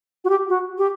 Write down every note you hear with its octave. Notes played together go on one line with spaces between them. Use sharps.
F#4
G4
F#4
G4